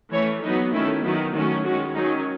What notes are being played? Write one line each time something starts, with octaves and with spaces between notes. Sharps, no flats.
E3 A3 C#4 C#5
F#3 B3 D#4
D#3 A3 C#4 E4
D#3 F#3 B3 E4
D#3 F#3 A3 C#4 F#4
D#3 G#3 C#4 F#4
D#3 F#3 C#4 D#4